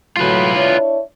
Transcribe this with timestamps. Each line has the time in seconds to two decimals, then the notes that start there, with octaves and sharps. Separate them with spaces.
0.17 A2 F#3 F4 B4
0.55 D4 E4 C#5